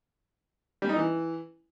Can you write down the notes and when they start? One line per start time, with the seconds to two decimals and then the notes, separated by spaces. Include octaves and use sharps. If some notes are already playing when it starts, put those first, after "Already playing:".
0.82 G3
0.89 D#4
0.96 E3